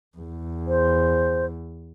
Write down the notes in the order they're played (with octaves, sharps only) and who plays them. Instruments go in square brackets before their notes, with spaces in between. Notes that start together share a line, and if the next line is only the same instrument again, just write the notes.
[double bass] E2
[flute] C5